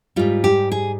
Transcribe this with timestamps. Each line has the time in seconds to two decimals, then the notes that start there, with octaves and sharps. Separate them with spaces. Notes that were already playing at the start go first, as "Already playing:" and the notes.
0.16 G#2 G3 F4
0.44 G4
0.72 G#4